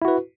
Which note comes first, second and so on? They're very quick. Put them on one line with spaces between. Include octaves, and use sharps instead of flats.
E4 F#4 B4